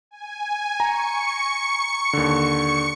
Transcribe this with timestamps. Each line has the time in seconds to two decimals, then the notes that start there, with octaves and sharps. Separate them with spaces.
0.11 G#5
0.80 A#5 C#6 C#7
2.13 D#2 D3